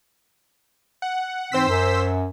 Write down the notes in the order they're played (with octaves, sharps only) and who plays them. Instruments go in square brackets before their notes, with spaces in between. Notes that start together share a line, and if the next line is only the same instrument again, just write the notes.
[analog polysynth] F#5
[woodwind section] G#2 E3 C4 [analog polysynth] C5 E6 B6
[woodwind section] F#2